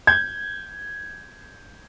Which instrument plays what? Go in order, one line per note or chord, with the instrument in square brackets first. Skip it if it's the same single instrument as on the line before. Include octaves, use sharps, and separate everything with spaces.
[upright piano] G6 G#6